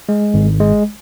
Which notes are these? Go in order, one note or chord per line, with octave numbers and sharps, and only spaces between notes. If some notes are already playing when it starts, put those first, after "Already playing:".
G#3
G#1
G#3